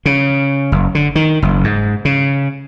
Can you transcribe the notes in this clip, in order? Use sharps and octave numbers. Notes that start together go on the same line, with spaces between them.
C#3
F#1
D3
D#3
F#1
G#2
C#3